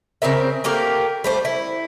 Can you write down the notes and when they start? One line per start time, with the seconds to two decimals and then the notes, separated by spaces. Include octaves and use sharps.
0.22 C#3 C4 A#4 E5
0.64 A3 A#3 G4 A#4
1.24 G3 A3 C5
1.45 E4